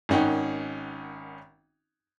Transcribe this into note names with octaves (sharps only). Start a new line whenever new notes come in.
G#1 D#3 C#4 D#4 F#5 G5